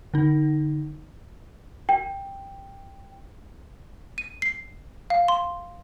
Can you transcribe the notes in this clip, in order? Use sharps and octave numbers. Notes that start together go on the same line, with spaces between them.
D3 D#4
G5
D#7
C7
F5
C6